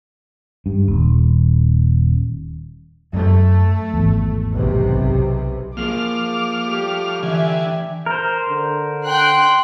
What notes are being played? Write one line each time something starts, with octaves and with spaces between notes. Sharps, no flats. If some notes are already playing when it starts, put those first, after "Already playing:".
G2
D#1
F#2 A3
G#1 E2
B1 C3
F3 A#3 G#4 A#4 D6 F6
G3 A3 G4
D3 E3 D4 E5 G#5
A#4 C5
D3
G5 C6 F#6